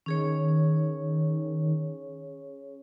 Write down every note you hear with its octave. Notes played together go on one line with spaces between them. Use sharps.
D#3 C#4 G#4 C#5